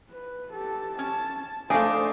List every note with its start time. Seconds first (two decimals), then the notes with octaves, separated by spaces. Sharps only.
0.10 B4
0.53 G4 A4
0.99 C#4 A5
1.70 A3 D4 D#4 C5 F5 G#5